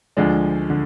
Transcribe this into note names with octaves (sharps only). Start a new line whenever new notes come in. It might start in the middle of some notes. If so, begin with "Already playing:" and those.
D2 D3 F3 G#3 D4
D3